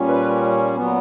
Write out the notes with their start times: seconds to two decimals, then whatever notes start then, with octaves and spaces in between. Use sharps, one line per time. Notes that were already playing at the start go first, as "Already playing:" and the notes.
Already playing: A#2 G3 C#4
0.08 B4
0.77 A#2 F#3 B3